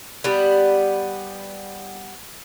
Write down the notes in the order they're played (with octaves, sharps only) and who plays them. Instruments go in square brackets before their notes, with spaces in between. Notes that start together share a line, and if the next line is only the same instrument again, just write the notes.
[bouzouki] G3 B3